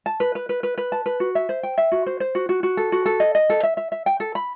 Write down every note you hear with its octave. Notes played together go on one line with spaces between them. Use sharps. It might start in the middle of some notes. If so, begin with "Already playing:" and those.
A5
B4
B4
B4
B4
B4
A5
B4
F#4
E5
C5
G5
E5
F#4
C5
C5
F#4
F#4
F#4
A4
F#4
A4
D#5
D#5
A4
E5
E5
E5
G5
A4
B5